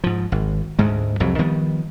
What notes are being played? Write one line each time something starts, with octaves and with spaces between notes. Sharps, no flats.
G#2 F3
G#1
D2 G#2 G#3
C2 F2 C3 F#3
D#3 F3 G3 B3